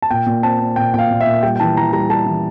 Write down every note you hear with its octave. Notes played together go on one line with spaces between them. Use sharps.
A5
A#2 G5
A#2
C4 A5
C4
A#2 G5
A#2 F5 G5
A#2
E5
A#2
G3 G5
G5
E3 A5
E3 A#5
G3 A#5
G3 A5
E3